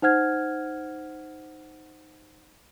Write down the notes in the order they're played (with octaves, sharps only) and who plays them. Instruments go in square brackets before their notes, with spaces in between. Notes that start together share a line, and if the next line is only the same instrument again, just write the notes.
[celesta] D#4 C5 F#5 F6 G#6